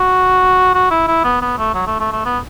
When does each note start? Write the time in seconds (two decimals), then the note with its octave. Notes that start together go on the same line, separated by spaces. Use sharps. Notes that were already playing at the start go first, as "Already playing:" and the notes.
Already playing: F#4
0.74 F#4
0.90 E4
1.07 E4
1.24 B3
1.41 B3
1.58 A3
1.75 F#3
1.87 A3
2.00 A3
2.12 A3
2.25 B3